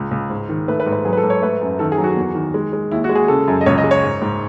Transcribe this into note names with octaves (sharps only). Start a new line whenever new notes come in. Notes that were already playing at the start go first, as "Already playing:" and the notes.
Already playing: C#2
C#2
G#2
D#3
A3 B4
B4
G#2
B4
F#3 G#4
B4
A4
G#2
C#5
A3 B4
F#2
D#3 A4
G#4
F#3
F#4
E2
D#3
G#3
G#3
D#2 E4
F#4
G#3
G#4
C#3 A4
F#2
D#5
C#2 C#5
D#5
G#3
C#5
G#2
G#2